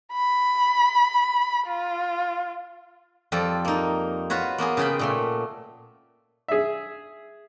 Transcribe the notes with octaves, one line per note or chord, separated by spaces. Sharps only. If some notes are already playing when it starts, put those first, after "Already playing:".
B5
F4
F2 G3 F4 A4
A#3 D#4
F4 F#4 B4 C#5
A#3 B3 F#4 G#4
C#3 F4 G#4 G5 B5
A#2 A3 C6
G#4 E5